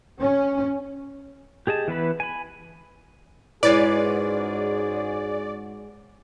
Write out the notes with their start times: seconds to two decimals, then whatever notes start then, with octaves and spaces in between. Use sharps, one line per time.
0.22 C#4
1.67 G4 G#4 D#5 A5
1.88 E3 B3 B4 B5
2.20 G#5 B5
3.63 G#2 G#3 C#4 E4 F#4 G#4 B4 D5